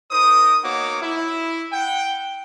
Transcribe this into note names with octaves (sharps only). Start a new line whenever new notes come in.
D#4 A#4 C5 D#6
A#3 B3 D#4 F#4 C#5 D6
E4
F#5 G5